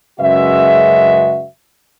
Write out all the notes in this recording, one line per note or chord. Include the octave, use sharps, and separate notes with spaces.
F#2 C#3 G#3 F#4 B4 E5